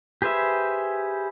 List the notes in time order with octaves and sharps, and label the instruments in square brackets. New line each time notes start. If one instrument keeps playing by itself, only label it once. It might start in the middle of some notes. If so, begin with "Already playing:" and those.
[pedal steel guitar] G4 G#4 B4 C5 E5